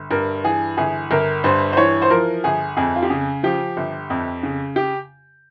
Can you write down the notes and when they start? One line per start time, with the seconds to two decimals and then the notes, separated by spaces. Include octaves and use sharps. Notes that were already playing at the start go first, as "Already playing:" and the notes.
Already playing: G1
0.11 G2 A#4
0.44 E3 G#4
0.77 G1 G#4
1.11 G1 A#4
1.44 G2 C5
1.73 C5
1.77 E3 C#5
2.02 C5
2.10 F3 A#4
2.44 G1 G#4
2.77 F2 G#4
2.96 F4
3.03 G4
3.10 C#3 G#4
3.43 F3 G4
3.77 G1
4.10 F2
4.43 C#3
4.76 G4